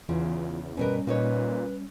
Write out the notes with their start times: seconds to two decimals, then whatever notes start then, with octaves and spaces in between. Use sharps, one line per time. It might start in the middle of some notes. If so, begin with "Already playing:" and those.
0.09 E2 C#3 E3 F4
0.77 G2 B2 G3 C#4 A#4 B4
1.07 A#2 A#3 D#4 B4 C#5